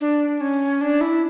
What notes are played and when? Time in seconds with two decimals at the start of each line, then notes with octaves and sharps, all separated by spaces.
0.01 D4
0.41 C#4
0.81 D4
1.01 E4